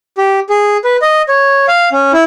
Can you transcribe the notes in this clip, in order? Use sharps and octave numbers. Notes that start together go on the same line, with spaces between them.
G4
G#4
B4
D#5
C#5
F5
C#4
E4